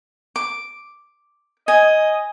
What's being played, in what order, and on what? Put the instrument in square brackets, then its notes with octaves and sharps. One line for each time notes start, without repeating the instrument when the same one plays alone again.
[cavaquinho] D6
[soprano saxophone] D#5 [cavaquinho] G#5